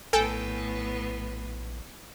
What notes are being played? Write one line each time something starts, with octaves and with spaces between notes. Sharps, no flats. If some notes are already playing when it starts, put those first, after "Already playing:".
A#1 A2 B3 A4 G5 G#5